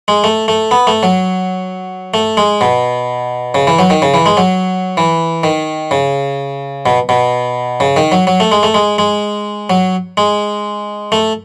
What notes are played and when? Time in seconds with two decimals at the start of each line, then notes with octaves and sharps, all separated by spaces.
0.08 G#3
0.24 A3
0.48 A3
0.71 B3
0.87 A3
1.03 F#3
2.14 A3
2.37 G#3
2.61 B2
3.55 C#3
3.67 E3
3.79 F#3
3.90 D#3
4.02 C#3
4.14 E3
4.26 G#3
4.37 F#3
4.97 E3
5.43 D#3
5.91 C#3
6.86 B2
7.09 B2
7.80 C#3
7.96 D#3
8.12 F#3
8.27 F#3
8.40 A3
8.52 G#3
8.63 A3
8.74 G#3
8.98 G#3
9.70 F#3
10.17 G#3
11.12 A3